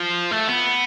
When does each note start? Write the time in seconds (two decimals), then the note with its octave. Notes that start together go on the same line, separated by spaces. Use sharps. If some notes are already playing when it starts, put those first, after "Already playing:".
Already playing: F3
0.31 A3
0.48 B3